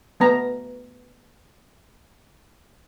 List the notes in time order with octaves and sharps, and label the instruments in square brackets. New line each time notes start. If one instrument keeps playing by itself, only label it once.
[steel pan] A3 B3 A#5